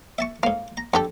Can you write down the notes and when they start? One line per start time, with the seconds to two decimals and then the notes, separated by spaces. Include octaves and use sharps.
0.19 E5 A5 C#6
0.43 G#2 A#3 F5
0.77 A#5
0.94 F2 D3 G4 A4